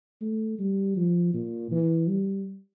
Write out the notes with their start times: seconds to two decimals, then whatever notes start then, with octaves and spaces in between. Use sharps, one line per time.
0.21 A3
0.59 G3
0.96 F3
1.34 A#2
1.71 E3
2.09 G3